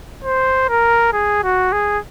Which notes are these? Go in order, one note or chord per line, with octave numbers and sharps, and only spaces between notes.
C5
A#4
G#4
F#4
G#4